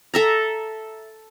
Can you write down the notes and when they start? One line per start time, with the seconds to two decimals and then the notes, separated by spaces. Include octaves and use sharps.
0.14 A4 E5 A#5